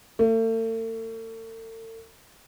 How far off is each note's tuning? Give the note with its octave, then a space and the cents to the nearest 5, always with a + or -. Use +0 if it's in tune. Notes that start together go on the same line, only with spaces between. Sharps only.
A3 +40